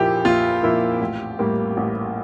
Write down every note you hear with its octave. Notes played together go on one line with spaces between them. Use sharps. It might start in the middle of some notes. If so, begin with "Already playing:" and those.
Already playing: A#1 A#2 F3 A#3 E4 G4
A#1 F4
A#2 F3 A#3 E4
A1
A2 G3 A#3
A1